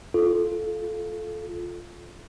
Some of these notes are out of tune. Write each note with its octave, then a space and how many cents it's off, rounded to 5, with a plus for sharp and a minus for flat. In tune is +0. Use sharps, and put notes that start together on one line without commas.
F4 +0 A4 -20